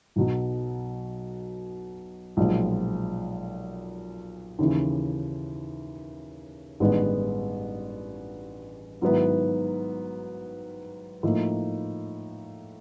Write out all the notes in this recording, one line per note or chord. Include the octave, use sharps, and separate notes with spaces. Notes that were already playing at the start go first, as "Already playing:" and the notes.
B1 B2 F#3
B1 A#2 F3 G#3
D#2 C#3 E3
A1 G2 D#3 G#3 B3
G#2 D#3 F#3 B3 E4
A2 F3 A#3 D#4